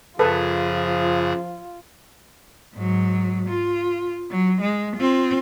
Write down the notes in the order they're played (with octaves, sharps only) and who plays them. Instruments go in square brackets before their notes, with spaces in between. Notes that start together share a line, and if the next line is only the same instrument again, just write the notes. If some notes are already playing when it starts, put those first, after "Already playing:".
[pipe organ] F#2 C#3 G#4 [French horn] F3 [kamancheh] F4 [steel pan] A4 B4
[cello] G#2 F#3
F4
F#3
G#3
C4 F4